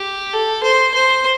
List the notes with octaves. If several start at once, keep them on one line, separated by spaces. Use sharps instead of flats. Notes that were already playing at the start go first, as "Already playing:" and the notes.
Already playing: G4
A4
C5
C5